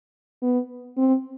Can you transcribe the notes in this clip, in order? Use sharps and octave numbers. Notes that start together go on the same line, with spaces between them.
B3
C4